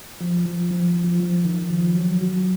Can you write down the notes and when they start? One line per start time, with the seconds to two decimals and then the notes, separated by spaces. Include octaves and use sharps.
0.21 F3
0.46 F3
0.71 F3
1.04 F3
1.20 F3
1.45 D#3
1.70 F3
1.95 F#3
2.21 F#3